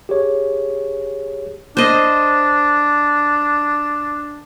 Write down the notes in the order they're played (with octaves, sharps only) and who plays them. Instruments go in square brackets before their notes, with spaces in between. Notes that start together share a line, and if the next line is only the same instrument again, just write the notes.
[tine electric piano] G4 G#4 C#5
[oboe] D4 [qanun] C5 D#5